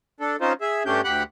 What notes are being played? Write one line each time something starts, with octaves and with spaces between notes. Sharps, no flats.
D4 A4
C4 C#4 D#4 F4 C5
G#4 E5
G2 A3 C#4 D4 G4 G6
D2 G4 F#5 B5 F#6